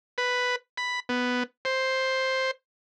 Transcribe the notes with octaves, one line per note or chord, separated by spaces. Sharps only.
B4
B5
B3
C5